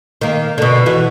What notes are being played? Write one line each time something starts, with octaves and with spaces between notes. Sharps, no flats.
D#3 A#3
B2 D3
E3 F#4